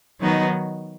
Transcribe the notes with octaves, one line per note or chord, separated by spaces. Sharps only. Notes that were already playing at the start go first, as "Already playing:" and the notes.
D#3 F#3 B3 D#4 F#4